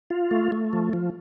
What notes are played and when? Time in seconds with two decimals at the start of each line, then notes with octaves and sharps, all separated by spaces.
0.10 F4
0.31 A3
0.52 A3
0.73 F3
0.93 F3